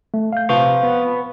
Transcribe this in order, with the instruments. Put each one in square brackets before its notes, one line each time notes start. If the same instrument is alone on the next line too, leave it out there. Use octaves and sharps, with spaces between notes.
[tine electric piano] A3
F5 G6
[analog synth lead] C3 [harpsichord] F3 [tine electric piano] B4 C#6
[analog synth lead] B3